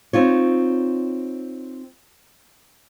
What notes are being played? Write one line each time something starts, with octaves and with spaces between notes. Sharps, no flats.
C4 D#4 F4 C#5